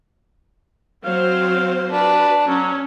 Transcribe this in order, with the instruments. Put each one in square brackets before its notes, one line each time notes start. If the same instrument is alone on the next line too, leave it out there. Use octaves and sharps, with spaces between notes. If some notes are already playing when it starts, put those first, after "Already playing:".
[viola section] F#3 C4 C5 [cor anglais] F5
[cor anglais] D4 [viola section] F#4 B4
[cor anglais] F#3 [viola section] C#4